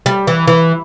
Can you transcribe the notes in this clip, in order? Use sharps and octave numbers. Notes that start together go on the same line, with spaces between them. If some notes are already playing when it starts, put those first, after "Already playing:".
G3
E3
E3